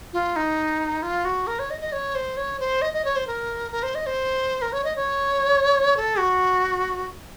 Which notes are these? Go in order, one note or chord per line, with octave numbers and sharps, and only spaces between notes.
F4
D#4
F4
F#4
A#4
C#5
D#5
D#5
C#5
C5
C#5
C5
D#5
D#5
C#5
C5
A#4
A#4
C5
D#5
C5
A#4
C#5
D#5
C#5
A4
F#4